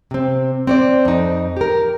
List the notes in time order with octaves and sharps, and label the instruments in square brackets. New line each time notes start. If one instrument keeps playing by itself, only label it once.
[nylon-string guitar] C3 C4
C4 C#5 D5
F2 D#4
G4 A#4